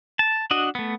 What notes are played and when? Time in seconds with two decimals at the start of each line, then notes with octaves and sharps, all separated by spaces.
0.19 A5
0.51 D4 F#4 D#5
0.75 A3 B3